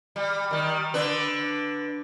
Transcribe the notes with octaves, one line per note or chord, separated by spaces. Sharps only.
G3
D#3 G3
D3 D4 B4